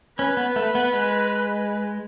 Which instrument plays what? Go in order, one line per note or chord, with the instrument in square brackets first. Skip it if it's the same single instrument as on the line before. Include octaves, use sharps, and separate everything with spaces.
[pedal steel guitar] C#4 [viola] B4
[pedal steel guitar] B3
A3
B3
G#3